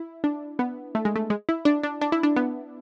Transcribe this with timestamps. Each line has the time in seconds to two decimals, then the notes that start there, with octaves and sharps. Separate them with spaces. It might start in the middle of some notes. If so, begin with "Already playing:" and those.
Already playing: E4
0.24 D4
0.59 B3
0.95 A3
1.05 G#3
1.16 A3
1.30 G#3
1.49 E4
1.65 D4
1.83 D4
2.01 D4
2.12 E4
2.23 D4
2.36 B3